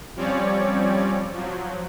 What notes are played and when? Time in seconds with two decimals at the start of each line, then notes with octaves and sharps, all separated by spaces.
0.16 F3 G3 C4 C#4 C#5 D5
1.34 F3 F#3